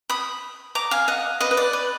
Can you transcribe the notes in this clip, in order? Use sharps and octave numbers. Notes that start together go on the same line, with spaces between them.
B5 D#6
A#5 D6
F5 G#5
D#5 F#5
B4 D#5
B4
D5
B4